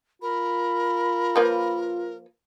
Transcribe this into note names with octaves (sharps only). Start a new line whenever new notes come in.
F4 A#4 B5
F3 A#3 B4